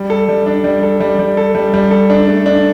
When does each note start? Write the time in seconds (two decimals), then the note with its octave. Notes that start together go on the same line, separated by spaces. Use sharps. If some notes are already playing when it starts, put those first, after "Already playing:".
Already playing: G3
0.10 A4
0.29 G3
0.47 D4
0.64 G3
0.83 A4
1.00 G3
1.19 G3
1.37 A4
1.55 G3
1.74 G3
1.91 A4
2.10 D4
2.28 A3
2.46 D4